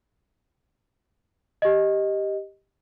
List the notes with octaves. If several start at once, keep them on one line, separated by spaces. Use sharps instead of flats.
G4 D#5